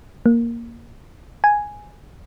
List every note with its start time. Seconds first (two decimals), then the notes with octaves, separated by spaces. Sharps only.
0.26 A#3
1.44 G#5